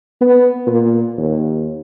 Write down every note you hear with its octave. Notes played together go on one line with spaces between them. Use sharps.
B3
A#2
D#2